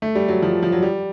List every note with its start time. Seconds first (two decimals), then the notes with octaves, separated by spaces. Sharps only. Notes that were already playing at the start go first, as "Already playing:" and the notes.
0.02 A3
0.15 G3
0.28 F#3
0.42 F3
0.63 F3
0.72 F#3
0.83 G3